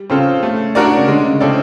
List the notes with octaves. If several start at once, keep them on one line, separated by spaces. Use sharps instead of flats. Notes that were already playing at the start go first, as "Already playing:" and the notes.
Already playing: G3
C#3 C4 F4 A4
A3
D4 F#4 A#4 D5
C#3
D3 G#3
C#3
C#3 C4 E4 A4 D5